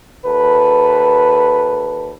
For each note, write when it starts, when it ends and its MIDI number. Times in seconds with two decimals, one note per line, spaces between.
0.25 2.13 39
0.25 2.13 69
0.25 2.13 71